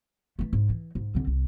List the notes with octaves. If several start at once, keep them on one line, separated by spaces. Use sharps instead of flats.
E3 A3
G#2
E3
G#2
D3 C4
C2